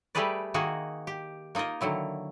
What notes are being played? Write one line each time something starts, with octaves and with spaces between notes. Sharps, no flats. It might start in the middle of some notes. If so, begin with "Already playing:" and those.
G3 A3 G4 G#4 B4 D5
D#3 A#3 D#4 F#4 G#4
G4
A#3 D#4 F4 A#4 D#5
D3 D#3 F#3 E4